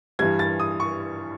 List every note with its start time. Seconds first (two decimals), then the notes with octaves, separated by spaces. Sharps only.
0.19 G2 E3 G3 G#6
0.39 A6
0.60 D#6
0.80 C#6